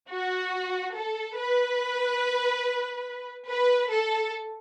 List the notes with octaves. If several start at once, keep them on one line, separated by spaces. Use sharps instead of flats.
F#4
A4
B4
B4
A4